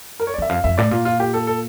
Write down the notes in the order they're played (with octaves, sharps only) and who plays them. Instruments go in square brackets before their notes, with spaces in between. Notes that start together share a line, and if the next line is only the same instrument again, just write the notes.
[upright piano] A#4
C#5
D5
[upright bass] E2 [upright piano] E5
[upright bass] F2 [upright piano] F5
[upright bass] F2 [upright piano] E5
[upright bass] A2 [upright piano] D5
[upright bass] A#2 [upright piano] F4
[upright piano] F4
G4
A4
A4